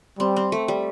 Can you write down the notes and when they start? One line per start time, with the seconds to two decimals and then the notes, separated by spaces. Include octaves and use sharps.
0.19 G3 C4
0.36 C4
0.52 A3
0.68 G3